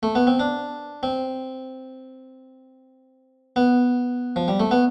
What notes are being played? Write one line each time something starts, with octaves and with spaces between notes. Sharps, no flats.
A3
B3
C4
D4
C4
B3
F3
G3
A3
B3